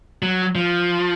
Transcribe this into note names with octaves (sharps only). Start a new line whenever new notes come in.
F#3
F3